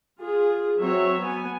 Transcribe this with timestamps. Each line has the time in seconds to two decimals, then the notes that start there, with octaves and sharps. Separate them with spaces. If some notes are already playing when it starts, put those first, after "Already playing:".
0.19 F4 G#4
0.79 F#3 C4 C#5 E5
1.20 B3 G#5